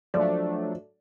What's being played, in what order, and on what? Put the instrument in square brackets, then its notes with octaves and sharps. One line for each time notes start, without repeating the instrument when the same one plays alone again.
[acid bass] F3 [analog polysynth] F#3 A3 D4 [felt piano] D5